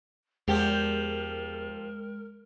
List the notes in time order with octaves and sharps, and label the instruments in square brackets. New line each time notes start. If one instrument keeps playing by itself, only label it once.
[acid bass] E2 [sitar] F3 G4 [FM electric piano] G#3 [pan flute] A#4